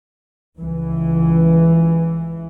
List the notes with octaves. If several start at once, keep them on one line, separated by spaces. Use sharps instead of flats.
C#2 E3